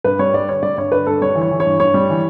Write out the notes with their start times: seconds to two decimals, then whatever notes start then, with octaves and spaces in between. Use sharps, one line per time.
0.04 G2 B4
0.19 G3 C#5
0.34 G2 D5
0.48 D3 C#5
0.63 G3 D5
0.77 G2 C#5
0.92 D3 B4
1.07 G2 A4
1.21 G3 C#5
1.35 E3
1.41 C#5
1.51 E3
1.60 C#5
1.66 G2
1.80 G2 C#5
1.94 G3
2.10 E3